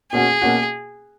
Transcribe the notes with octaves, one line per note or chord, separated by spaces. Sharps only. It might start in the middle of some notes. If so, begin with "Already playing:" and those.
B2 A#3 C#4 F#4 G#4
B2 A#3 C#4 F#4